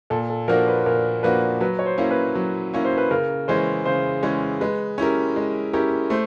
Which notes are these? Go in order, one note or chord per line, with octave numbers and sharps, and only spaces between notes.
A#2 A4
A4
F3 A#3 D4 F#4 A#4
B4
A#2 A#4
F3 A#3 D4 F#4 B4
F#3 B4
C#5
C5
A#3 C#4 E4
B4
F#3
A#3 C#4 E4
C5
B4
C#3 A#4
E3 G#3 C#4 C5
C#3 C5
E3 G#3 C#4
G#3 B4
C#4 E4 G4 A#4
G#3
C#4 E4 G4 A#4
A3 C5